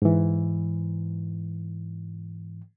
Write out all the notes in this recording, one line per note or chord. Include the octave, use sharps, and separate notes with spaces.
G#2 E3